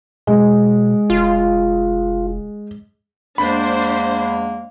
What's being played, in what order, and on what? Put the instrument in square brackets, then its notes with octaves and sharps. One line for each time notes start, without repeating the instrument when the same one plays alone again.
[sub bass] B2 [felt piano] G#3
[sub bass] F1 [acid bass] F4
[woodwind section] E2 G#3 A#3 [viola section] D4 C5 [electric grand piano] B5